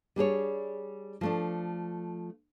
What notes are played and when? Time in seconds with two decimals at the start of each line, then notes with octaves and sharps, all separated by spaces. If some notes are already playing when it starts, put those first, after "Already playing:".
0.16 G3 D4 G#4 C#5
1.21 F3 A3 D4